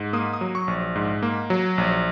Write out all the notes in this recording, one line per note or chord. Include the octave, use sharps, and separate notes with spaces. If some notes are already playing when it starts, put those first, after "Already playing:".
Already playing: G#2
A#3 D#6
D#6
F#3
C#6
A#1
G#2
A#3
F#3
A#1